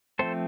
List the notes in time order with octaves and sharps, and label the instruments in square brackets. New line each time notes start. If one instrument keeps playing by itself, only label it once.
[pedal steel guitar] F3 A3 C4 A4 C5